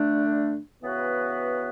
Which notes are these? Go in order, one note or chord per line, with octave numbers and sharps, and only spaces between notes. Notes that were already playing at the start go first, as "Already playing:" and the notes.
Already playing: D3 A3 D4
C#3 E3 B3 F#4 B4